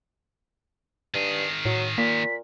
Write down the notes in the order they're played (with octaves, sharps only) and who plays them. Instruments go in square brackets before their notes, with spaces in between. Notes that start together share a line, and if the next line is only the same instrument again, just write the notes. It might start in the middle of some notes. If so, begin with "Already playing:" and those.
[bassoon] G2 [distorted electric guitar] D#3 G#4
[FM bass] A2 [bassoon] F#3
[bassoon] A#2 [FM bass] A#3 [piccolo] B6